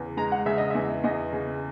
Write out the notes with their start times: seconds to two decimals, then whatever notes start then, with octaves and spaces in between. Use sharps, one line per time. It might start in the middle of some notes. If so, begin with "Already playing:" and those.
Already playing: E2 C#3
0.17 G#3 A#5
0.32 F#5
0.46 C#3 E5
0.58 D#5
0.71 E2 E5
1.04 E2 D#5
1.32 C#3